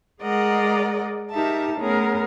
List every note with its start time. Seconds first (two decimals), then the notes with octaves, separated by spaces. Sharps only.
0.23 G#3 G#4 A#4 D5 D#5 F#5
1.31 D#4 G4 A#4 E5 A5
1.80 A3 B3 C#4 G#4 A#4